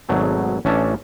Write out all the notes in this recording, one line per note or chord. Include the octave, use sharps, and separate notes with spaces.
G#1 B2 F#3 A3 G#4
A1 C#4 D4 E5 A5